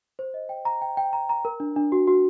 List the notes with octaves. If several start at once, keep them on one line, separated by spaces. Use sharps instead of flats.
C5
D#5
G5
A#5
G5
G5
A#5
A#5
A#4
D4
D4
F#4
F#4